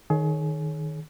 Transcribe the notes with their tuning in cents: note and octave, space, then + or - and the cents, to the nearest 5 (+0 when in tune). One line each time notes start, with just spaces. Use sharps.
D#3 -5 G#4 +30 C#5 +0